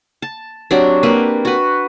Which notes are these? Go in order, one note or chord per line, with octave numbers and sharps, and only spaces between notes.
A5
F#3 C4 D4 G4
A#3 C4 B4
F#4 B4